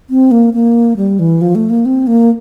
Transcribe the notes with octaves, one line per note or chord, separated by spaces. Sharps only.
C4
A#3
A#3
G3
E3
F3
A3
A#3
C4
A#3